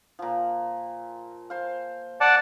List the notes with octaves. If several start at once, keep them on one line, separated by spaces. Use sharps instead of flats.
A#2 F3
C5 F5
D5 F#5 A5